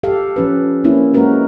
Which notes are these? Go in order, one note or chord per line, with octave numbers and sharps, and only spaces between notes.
G4 A4 F5
F3 C#4 B4
A#3 C4 C#4 E4
G#3 A#3 C#4 F#4 A#4 B4